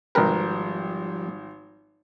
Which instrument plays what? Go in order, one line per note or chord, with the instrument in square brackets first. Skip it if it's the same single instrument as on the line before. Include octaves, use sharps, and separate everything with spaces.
[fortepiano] G#1 G5 [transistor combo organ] F3 G3 [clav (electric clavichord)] A#4 B4